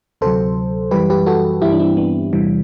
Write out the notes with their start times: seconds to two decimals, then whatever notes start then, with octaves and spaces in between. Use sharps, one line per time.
0.21 D2 C3 F#3 A4 C5
0.91 F#2 E3 G3 G4 B4
1.10 G4 B4
1.26 F#4 A4
1.62 G2 E3 G3 E4 G4
1.72 D4
1.79 C4 E4
1.97 B3 D4
2.33 E2 C3 E3 G3